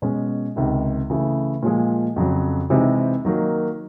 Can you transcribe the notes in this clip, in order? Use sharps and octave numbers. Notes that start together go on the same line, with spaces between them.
B2 G#3 C#4
C#2 C3 D#3
C#3 E3 A3
A#2 F3 G#3
F2 C#3 F#3
C3 E3 G#3 C4 D#4
D#3 F#3 A#3 D#4